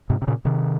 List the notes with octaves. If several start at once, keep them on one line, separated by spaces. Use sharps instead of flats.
G#2 C3
C3
A#2 C#3
C3 D#3